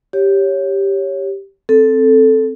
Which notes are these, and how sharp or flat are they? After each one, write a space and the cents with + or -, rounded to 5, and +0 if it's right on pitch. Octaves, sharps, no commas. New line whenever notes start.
G4 +0 C#5 +0
C4 +0 A4 +0